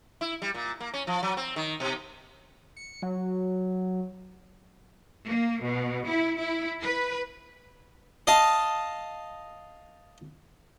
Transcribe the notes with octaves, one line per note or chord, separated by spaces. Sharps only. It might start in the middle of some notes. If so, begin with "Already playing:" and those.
E4
G3
A#2
A#3
C#4
F3
F#3
C4
D#3
B2
C#7
F#3
A#3
B2
E4
E4
B4
D#5 F5 A5